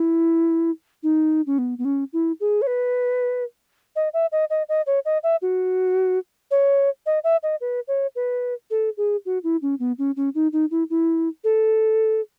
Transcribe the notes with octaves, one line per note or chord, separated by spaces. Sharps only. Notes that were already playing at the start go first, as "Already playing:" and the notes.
Already playing: E4
D#4
C#4
B3
B3
C#4
E4
G#4
C#5
B4
D#5
E5
D#5
D#5
D#5
C#5
D#5
E5
F#4
C#5
D#5
E5
D#5
B4
C#5
B4
A4
G#4
F#4
E4
C#4
B3
C#4
C#4
D#4
D#4
E4
E4
A4